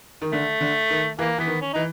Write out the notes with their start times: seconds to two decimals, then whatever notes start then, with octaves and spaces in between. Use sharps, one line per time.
0.22 D#3
0.32 D3 A3
0.61 D3
0.90 D#3
1.18 E3 A#3
1.38 E3 B3
1.47 D#3
1.61 C#4
1.73 E3 D#4